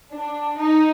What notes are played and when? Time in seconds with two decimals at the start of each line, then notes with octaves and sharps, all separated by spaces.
0.12 D4
0.60 D#4